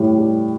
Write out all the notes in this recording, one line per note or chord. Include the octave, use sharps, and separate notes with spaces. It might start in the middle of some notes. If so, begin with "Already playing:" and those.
Already playing: A2 G3
G3